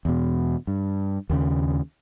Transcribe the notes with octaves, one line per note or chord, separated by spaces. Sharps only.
E2 B2
G2
D#2 C#3